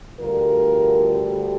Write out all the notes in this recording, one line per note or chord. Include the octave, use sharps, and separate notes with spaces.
D2 D3 G3 F4 A#4